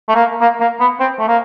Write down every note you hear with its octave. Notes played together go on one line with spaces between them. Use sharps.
A3
A#3
A#3
A#3
B3
C4
A3
A#3